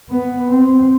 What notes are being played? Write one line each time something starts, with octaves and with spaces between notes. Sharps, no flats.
B3
C4